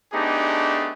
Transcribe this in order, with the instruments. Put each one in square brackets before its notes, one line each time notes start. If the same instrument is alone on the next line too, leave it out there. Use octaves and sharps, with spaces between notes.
[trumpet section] A3 B3 D4 D#4 G4 G#4